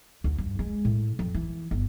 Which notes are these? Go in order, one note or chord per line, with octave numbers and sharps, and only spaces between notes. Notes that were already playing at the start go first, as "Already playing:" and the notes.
D2
G2
G#3
A2
F2
E3
G1